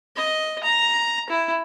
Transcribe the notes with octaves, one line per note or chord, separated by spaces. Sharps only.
D#5
A#5
E4